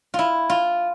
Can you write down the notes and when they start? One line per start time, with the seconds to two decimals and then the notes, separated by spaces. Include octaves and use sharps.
0.14 E4 F4
0.50 F4